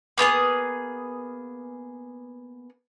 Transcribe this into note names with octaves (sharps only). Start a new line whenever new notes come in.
A#3 B3 G#4 D#6